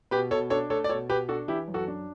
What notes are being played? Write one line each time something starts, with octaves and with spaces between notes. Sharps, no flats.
B2 G4 B4
B2 A4 C#5
D4 A4 C#5
A3 A4 C#5
D5
B2 A4 C#5
B2 G4 B4
D4 F#4 A4
E3 E4 G4
F#2
F#4 A4
D4